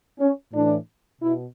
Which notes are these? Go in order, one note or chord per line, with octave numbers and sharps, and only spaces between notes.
C#4
A2 E3 D4
B2 E4